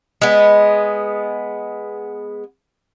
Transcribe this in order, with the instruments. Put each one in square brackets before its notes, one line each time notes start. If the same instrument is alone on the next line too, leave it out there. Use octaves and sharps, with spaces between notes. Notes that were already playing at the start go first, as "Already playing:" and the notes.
[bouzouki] G#3 B3